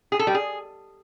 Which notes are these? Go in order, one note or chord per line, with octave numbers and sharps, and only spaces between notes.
G#4
A4
G3
G#4